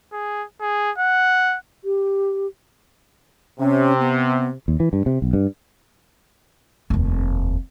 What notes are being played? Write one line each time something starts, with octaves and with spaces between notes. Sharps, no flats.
G#4
G#4
F#5
G4
C3 C#4
B3
D#2
E3
G2
C3
B1
G2
F1 D#2